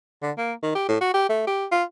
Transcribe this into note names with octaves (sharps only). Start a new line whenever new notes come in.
D3
A#3
D#3
G4
A2
F#4
G4
A3
G4
F4